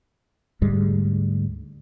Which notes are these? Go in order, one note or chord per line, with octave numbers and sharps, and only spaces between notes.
D2 G#2 G3 G#3